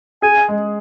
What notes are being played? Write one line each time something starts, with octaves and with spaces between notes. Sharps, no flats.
G#4 G#5
G#3